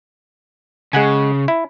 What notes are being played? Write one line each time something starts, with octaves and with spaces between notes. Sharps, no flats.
C#3 G#3 F#5 G#5
E4